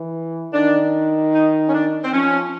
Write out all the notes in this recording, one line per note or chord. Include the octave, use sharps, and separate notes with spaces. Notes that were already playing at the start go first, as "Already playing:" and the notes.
Already playing: E3
D#3 D4
D#4
C#4
D4
C4
F3 C#4